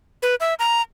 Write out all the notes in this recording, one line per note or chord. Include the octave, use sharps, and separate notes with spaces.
B4
E5
A#5